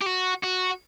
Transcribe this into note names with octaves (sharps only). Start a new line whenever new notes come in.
G4
F#4
F#4